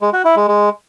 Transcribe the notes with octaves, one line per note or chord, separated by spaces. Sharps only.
G#3
F#4
E4
G#3
G#3